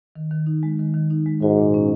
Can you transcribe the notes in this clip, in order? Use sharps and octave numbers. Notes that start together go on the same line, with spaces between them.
D#3
D#3
D#4
G#3
D#3
D#3
D#4
G#3
G#2 F#4
A#2
C#4